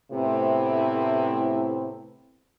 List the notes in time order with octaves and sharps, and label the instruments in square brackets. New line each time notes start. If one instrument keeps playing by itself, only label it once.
[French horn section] A2 C3 A3 B3 C4 E4